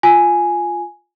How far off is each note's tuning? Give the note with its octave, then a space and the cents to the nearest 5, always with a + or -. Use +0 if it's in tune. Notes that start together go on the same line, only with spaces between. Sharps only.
F4 +0 G#5 +5